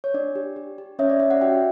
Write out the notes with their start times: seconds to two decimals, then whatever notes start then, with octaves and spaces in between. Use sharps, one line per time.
0.04 C#5
0.14 D4 D5
0.36 G4
0.56 G4
0.78 G4
0.99 C#4 C#5 E5
1.10 D5
1.20 C#4 C#5 E5
1.30 D5 F#5
1.41 F#4 E5 G5